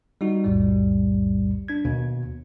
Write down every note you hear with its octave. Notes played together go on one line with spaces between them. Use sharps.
G3 D#4 F#4
B1 F2 A2 G3
D4 G#6
D#2 B2